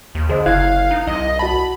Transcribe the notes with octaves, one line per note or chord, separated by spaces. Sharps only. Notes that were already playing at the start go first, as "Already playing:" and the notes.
D#2
D3 G#4 C5 D#5
F#1 E4 F5 F#6 G#6
D#4
C2 D#5
F#4 A5 B5